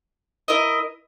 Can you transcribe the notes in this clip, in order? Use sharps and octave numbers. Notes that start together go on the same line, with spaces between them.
E4 A#4 D#5